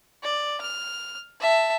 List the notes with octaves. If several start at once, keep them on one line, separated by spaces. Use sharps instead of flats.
D5
F6
E5 A5